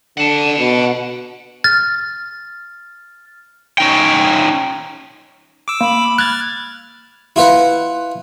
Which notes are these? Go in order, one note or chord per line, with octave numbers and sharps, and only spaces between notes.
D3 F#5 A5
B2
F6 A6
C#4 D#4 G5
D6 E6
A#3 B5
F6 F#6 G#6 A6
E4 F4 B4 F#5